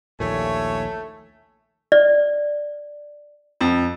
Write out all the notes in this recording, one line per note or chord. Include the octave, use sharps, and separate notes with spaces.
A#1 D#2 A#2 A3 C#5 E5 G#5
D5
F2